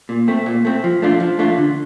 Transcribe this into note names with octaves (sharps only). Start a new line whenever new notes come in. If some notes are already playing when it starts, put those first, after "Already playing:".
A#2
A3 C4
A#2
A3 C4
F3
A3 D4 F4
F3
A3 D4 F4
D3